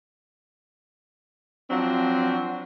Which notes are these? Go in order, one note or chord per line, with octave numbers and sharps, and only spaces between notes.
F3 F#3 C4 D4